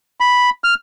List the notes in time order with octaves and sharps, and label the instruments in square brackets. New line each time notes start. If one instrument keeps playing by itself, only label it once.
[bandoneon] B5
F6